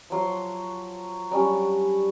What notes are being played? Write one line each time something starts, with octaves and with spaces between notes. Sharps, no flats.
F3 F#3 C6
F#3 G3 C#4 D4